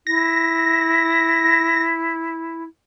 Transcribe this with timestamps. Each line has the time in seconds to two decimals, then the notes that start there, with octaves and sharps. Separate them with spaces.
0.07 E4 A#6